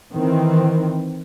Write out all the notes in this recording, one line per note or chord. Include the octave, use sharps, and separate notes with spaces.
D#3 E3 C4